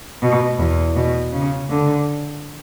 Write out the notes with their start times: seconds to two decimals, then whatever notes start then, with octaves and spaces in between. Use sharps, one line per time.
0.22 B2
0.59 E2
0.96 B2
1.32 C#3
1.69 D3